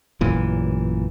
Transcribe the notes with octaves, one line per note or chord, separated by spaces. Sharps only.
A1 F#2 A#2 E3